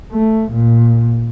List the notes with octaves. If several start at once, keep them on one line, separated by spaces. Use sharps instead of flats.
A3
A#2